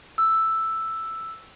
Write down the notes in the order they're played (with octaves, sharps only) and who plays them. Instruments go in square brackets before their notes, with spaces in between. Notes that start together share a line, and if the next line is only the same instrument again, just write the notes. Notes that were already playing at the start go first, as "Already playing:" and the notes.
[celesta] E6